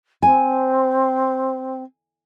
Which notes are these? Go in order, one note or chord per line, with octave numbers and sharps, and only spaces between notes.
C4 G#5